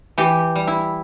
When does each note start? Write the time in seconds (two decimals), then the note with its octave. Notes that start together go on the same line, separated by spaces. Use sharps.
0.18 E3 G4
0.56 G3
0.67 E4